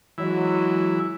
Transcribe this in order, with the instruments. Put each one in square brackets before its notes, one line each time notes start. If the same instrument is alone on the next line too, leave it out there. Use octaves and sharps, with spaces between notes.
[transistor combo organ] E3 E4 [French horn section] F#3 G#3